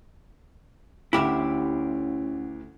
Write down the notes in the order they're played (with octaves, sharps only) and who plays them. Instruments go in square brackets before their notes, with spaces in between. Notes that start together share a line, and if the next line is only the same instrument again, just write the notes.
[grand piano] D2 D3 [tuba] C#4 [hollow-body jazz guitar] E4 G4 E5